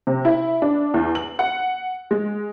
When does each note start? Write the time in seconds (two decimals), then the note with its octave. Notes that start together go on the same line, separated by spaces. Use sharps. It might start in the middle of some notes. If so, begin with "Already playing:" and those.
0.07 C3
0.25 E4
0.62 D4
0.94 E2
1.15 F#7
1.39 F#5
2.11 G#3